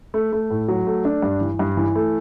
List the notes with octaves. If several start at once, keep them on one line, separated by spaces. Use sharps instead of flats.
A3
A3
A2
F#3
A3
D4
G2
E3
G2
E3
A3